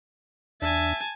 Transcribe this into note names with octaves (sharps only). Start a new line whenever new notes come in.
E2 D4 E5 G#5 A5